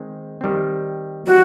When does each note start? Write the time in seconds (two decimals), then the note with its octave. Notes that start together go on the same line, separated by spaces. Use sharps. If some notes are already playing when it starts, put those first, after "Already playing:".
Already playing: D#3 G#3 C4
0.41 D#3 G3 C4
1.27 E3 G3 C4 D#4 F#4